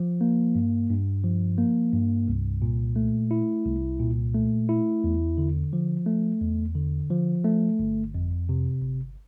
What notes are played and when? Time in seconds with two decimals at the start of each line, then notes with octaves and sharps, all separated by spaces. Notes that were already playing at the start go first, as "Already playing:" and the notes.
Already playing: F3
0.21 A#3
0.55 G2
0.90 G2
1.24 F3
1.58 A#3
1.92 G2
2.28 C2
2.62 A#2
2.96 A3
3.31 E4
3.66 C2
4.00 A#2
4.35 A3
4.69 E4
5.04 E2
5.38 D3
5.73 F3
6.06 A3
6.41 E2
6.75 D3
7.10 F3
7.45 A3
7.79 G1
8.14 F2
8.49 C3
8.82 G1